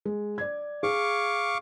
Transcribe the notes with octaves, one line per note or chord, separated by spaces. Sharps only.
G#3
D5 G#6
G#4 F5 C#6 D6